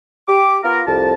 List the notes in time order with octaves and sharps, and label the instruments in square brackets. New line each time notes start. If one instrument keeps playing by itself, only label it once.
[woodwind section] G4 D6
B3 F4 A#4
C2 F2 A5